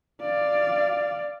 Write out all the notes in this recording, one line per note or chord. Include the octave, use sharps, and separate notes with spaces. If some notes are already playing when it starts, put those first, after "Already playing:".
D5 F5